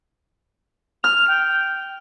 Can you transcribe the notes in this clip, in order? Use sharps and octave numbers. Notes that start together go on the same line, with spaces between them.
F6 F7
G5